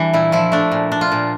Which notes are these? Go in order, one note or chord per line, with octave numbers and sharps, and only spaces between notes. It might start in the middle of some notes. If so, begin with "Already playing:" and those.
Already playing: E3 G3 D4
A#2 E4
F3 E4
A3 D4
A#2
D4
F4
A#2